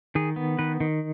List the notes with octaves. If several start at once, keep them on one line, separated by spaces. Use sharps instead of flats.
D#3 G#4
B3
D#3 B4
D#3